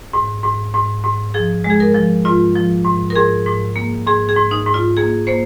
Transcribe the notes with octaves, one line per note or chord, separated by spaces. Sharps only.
G#2
G#2
G#2
G#2
F3 G#4
G#3
G#4
A#4
F3
G#2 F4
F3
G#2
A#4
G#2 G#4
G#2
A#3
G#2 G#4
G#4
G#2
D#4
G#2
F4
A#3 G#4
A#3 C5